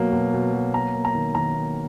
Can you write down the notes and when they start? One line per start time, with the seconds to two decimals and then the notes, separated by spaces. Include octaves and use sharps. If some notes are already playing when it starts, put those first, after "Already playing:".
Already playing: B2 F#3 A#3
0.12 B2
0.33 B2
0.53 F#3
0.74 A#3 A#5
0.94 A#3
1.05 A#5
1.15 D#3
1.35 D#3 A#5
1.55 A#3